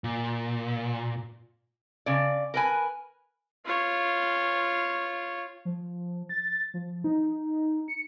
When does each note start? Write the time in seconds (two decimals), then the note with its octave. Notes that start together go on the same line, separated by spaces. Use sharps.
0.04 A#2
2.06 C#3 D5
2.54 A#4 B4 G#5
3.65 F4 C#5
5.65 F3
6.29 A6
6.74 F3
7.04 D#4
7.88 C#7